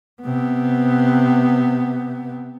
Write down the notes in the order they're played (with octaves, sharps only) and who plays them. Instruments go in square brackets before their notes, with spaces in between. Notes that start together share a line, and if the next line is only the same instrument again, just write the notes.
[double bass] C3 B3